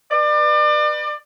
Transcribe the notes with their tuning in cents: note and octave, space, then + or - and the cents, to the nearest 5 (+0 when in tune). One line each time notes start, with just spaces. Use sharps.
B4 +0 D5 +35